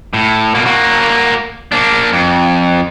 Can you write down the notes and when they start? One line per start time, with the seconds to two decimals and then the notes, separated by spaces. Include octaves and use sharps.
0.14 A2
0.55 B2 A#3
0.66 A#3 F#4
1.72 A#3 D4
2.12 F2